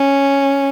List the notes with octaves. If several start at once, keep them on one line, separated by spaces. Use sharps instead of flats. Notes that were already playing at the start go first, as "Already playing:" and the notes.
Already playing: C#4